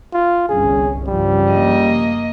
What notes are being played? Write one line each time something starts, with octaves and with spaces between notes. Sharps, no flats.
F4
G1 C2 C#4 G#4
G2 C#3 F3 G3
A#3 D#5